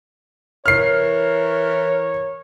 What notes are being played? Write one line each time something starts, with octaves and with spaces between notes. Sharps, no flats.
E3 A#4 C#5 F6 C7